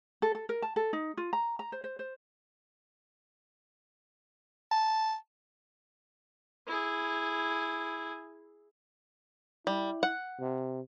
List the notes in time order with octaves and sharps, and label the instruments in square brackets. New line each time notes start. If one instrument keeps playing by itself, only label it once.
[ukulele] A4
A4
A#4
A5
A4
D#4
F4
A#5
A#5
C5
C5
C5
[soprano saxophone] A5
[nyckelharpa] E4 G#4
[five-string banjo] G3 [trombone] E4
[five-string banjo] F#5
[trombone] C3